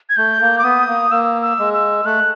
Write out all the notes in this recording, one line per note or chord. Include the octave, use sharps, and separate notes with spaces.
G#6
A3 G6
A#3
D6
B3 D#6
A#3
A#3 E6
E6
G#3
E6
A3 F#6